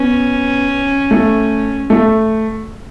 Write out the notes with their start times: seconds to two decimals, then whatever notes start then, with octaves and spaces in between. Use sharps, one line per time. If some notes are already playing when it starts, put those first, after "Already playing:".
Already playing: B3 C#4
1.11 A3
1.90 A3